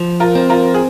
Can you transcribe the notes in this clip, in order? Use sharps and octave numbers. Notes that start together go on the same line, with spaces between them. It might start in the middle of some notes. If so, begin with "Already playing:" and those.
Already playing: F3
F4 A#4
C4
F4 A#4
G#4